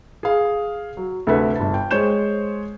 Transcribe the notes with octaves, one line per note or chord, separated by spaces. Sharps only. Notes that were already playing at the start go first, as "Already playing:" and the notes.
G#4 F5
F#3
D2 C3 A4 B4 E5
G1 A5
G5
G#3 C5 C#5 G6 E7